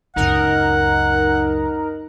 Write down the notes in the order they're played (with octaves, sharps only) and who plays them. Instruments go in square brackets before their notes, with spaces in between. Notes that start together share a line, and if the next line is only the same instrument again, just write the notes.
[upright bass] C#2 F#2 [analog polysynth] D#4 A#4 [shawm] F#5